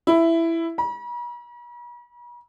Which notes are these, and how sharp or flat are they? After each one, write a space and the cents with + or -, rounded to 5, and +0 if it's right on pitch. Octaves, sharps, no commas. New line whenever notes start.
E4 +10
B5 -45